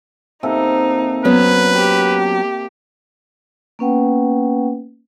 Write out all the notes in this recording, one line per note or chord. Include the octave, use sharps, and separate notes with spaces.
C3 A#3 D#4 A4
F#3 B3 C#4 B4
G4
A#3 B3 C#4 B4 F#5 G5